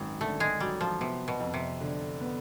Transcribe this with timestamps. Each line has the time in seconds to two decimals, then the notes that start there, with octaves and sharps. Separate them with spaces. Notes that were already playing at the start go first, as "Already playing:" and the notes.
Already playing: G#1 F#2
0.21 D3 A3
0.40 G#3
0.60 F#3 G3
0.81 F3
1.00 C3 B3
1.28 B2
1.40 F2
1.54 C3
1.81 D3
2.21 B3